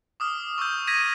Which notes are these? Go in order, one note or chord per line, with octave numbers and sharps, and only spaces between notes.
D6 D#6 F6
C#6 D#6 E6 G6
G#6 A#6 B6 D#7